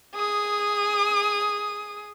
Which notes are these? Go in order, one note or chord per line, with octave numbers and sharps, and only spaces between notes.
G#4 D#6